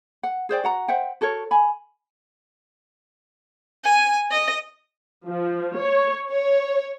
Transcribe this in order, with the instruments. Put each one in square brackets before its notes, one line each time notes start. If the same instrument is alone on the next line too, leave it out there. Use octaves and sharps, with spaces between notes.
[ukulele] F#5
G#4 C5 D5 G5
F#4 F#5 A#5
C5 E5 F#5 G5
F#4 A4 A#4 C#5
G#5 B5
[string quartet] G#5
D#5
[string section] F3
C#5
C#5